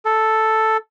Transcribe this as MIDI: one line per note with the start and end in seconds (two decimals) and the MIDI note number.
0.05 0.77 69